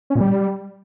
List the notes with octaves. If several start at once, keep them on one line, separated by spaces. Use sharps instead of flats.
C#4
A#2
G3